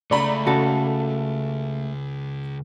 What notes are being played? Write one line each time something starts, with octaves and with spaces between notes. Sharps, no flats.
C#2 A3 D5 A#5 B5
C#3 F#4 A4